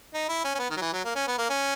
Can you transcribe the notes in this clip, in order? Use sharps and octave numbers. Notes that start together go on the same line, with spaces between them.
D#4
E4
C#4
C#4
B3
D#3
F#3
E3
F#3
A#3
C#4
B3
A#3
C#4